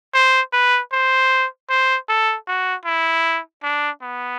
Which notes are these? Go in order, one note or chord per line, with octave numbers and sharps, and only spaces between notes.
C5
B4
C5
C5
A4
F#4
E4
D4
B3